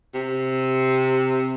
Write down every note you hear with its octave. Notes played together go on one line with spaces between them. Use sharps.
C3